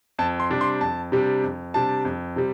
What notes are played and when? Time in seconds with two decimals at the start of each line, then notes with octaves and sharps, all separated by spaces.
0.19 F2 A5
0.40 C6
0.50 C3 G3 D4
0.61 C6
0.81 F2 A5
1.12 C3 G3 D4
1.43 F2
1.74 C3 G3 D4 A5
2.05 F2
2.36 C3 G3